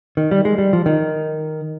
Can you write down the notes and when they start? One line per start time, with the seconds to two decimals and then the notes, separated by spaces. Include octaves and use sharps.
0.17 D#3
0.31 G3
0.45 G#3
0.58 G3
0.73 F3
0.86 D#3